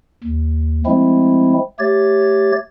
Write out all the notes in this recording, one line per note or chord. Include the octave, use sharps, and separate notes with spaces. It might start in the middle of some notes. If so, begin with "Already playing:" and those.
D#2
F3 G#3 A3 C4 E4
A3 G4 C#5 A6